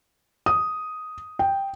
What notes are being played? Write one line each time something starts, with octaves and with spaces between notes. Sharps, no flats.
D#6
G5